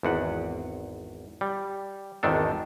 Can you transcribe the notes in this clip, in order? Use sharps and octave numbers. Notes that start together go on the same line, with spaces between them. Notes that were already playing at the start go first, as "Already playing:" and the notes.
G#1 E2 F#5
G3
G#1 E2 D#3 D4 A4